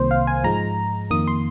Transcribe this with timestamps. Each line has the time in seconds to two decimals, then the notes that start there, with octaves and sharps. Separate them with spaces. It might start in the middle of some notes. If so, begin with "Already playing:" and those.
Already playing: C2 C3 D#3 A#3 C5
0.11 F5
0.27 G#5
0.44 G#2 F3 G#3 A#5
1.11 F2 D#3 A#3 D#6
1.27 C6